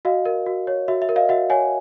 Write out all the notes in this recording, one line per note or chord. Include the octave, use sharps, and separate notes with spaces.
F#4 D#5 F5
A#4
F#4
C#5
F#4 E5
E5
A#4
D#5 F5
F#4 E5 F#5
C#5 F#5 G#5